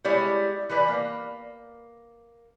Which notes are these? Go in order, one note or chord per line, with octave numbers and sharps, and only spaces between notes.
G3 G#3 E4 C#5 D5
E3 G3 B4 D5
A#3